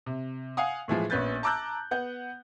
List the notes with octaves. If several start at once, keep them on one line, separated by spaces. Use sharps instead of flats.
C3
F5 F#5 G#5 D#6
A2 E3 F3 G#3
A#1 B3 C#4 B4 G6 A6
A5 A#5 D6 E6 F#6 G6
B3 F#5 G6